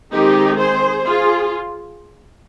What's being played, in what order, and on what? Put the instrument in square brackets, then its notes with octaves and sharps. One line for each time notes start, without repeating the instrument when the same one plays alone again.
[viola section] D#3 G#3 C4 D#4 G4
G#4 C5
F4 G#4